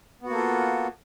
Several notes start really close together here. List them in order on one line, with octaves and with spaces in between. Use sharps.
B3 F#4 A#3 A4 F4